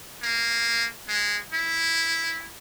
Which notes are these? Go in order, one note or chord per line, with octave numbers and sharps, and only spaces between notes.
A#3
G#3
E4